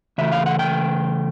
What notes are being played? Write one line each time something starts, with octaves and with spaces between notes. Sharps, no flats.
C#3 E3 A3 E5
F5
F#5
G5